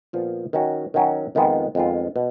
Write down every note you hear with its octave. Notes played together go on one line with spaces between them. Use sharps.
A#2 F3 B3 F4
D#3 F#3 C#4 F#4
D#3 F#3 C#4 F#4
F2 D#3 G#3 B3 F4
F2 D#3 G#3 B3 F4
B2